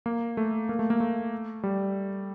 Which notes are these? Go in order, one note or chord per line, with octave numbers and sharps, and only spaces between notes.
A#3
A3
A#3
A3
A#3
A3
G3